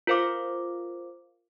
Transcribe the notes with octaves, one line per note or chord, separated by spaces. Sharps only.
F4 A#4 C5 F5 D6